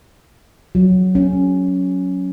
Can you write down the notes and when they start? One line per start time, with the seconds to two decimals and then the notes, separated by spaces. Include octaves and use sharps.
0.75 F#3
1.15 C#4